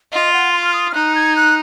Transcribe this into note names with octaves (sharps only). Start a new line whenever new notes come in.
F4 D#5
F#5
C6
F6
D#6
F6
D#4 F#6
G#6
F#6